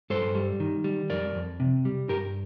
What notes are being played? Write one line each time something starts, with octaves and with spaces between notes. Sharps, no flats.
G2 A4 C5
G3
D#3
G3
F2 A#4 D5
F2
C3
G3
G2 G4 A#4